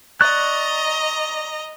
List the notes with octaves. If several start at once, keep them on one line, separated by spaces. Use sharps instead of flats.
D5 D#5 A#5 C#6 F#6